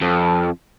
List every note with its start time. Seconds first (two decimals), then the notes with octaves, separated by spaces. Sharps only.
0.02 F2